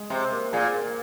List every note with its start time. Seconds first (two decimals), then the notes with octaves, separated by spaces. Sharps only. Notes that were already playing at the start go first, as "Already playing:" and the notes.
Already playing: G#3
0.10 C3 C5
0.31 A#3
0.53 A#2 G#4
0.74 A#3